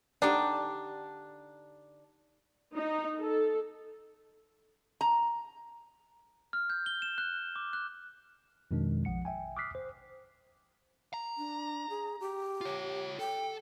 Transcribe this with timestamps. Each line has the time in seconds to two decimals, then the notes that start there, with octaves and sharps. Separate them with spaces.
0.22 D3 D4 D#4 G4
2.76 D#4
3.19 A4
5.01 A#5
6.53 F6
6.70 G6
6.86 G7
7.02 E7
7.18 F#6
7.56 D6
7.73 F#6
8.71 F2 B2 D#3 G#3 D4
9.05 A#1 F3 F#5 C#7
9.25 E5 G5 G#5
9.57 D6 D#6 F6 F#6 B6 C7
9.75 C5
11.14 A#5
11.38 D4
11.90 G#4
12.20 G4
12.61 F4 C#5
13.19 A4 G5